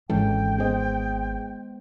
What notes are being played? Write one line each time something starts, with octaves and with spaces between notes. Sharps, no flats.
G#1 E3 G#3 C#4 A4 G5
B3 G#4 C5 D#5